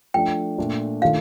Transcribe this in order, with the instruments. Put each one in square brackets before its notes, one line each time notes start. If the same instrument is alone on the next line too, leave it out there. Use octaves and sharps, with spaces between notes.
[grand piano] F3 A3 D4 [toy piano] G5
[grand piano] A#2 A3 D4 F4
[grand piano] D#3 A3 D4 F4 [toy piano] F5